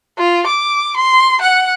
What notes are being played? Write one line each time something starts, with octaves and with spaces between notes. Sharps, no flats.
F4
D6
C6
F#5